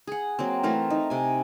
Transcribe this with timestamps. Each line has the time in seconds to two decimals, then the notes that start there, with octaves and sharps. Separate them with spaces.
0.07 G#4 F#5
0.39 F#3 A#3 C4
0.63 E3 A3 A#4 C5
0.90 D#4
1.10 C3 G#5